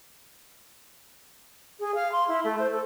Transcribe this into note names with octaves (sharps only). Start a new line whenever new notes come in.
G#4
F5
C6
E4
A3
C5
A4